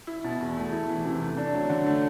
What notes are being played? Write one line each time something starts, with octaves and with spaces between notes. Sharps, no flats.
E4
B2
E2
A3
E4
E3
C3
A3
D4
F#3
D3
A3